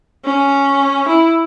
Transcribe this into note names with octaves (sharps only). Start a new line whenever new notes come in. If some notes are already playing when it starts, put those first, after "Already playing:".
C#4
E4